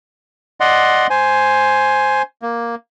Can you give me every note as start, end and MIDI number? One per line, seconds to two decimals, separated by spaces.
0.60 1.07 74
0.60 1.07 75
0.60 1.07 78
0.60 1.07 84
1.10 2.22 72
1.10 2.22 80
2.42 2.75 58